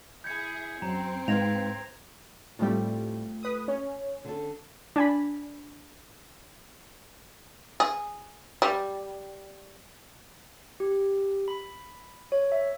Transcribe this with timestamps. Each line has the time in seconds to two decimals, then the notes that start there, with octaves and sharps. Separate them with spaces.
0.24 E4 G#4 G6 G#6 C#7
0.82 F#2 C4 A#5
1.28 G#2 B4 F5 G#6 A#6 F7
2.59 A2 G3 A3 C4 F4
3.43 B4 D#6
3.68 C#4
4.25 D3 A4
4.96 D4 G#5 B5
7.80 G#4
8.62 G3
10.80 G4
11.48 B5
12.32 C#5
12.52 E5